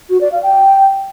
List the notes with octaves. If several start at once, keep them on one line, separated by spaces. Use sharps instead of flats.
F#4
D5
F5
G5